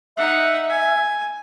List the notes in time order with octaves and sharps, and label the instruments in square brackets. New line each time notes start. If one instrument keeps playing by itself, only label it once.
[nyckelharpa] D#4 F#5 [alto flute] E5
[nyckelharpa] G#5